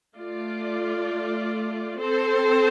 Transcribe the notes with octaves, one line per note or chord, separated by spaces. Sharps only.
A3 F4 D5
C4 A4 C5